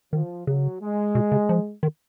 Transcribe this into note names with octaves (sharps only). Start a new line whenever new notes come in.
D#3 F3
C#3 F#3
G#3
B2
C#3
F3
D#3